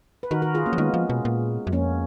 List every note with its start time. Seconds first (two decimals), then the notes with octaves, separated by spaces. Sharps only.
0.23 B4
0.31 D#3 F#4 A#4
0.42 F#4 A#4
0.55 F4 G#4
0.66 A#3 C#4
0.73 F3
0.78 D#3 G#3 B3
0.94 F3
1.10 B2
1.25 A#2
1.67 F#2
1.72 F2 A#3 C#4